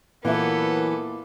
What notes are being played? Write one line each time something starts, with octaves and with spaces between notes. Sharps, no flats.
A#2 E3 F#3 B3 A4 A#4 E5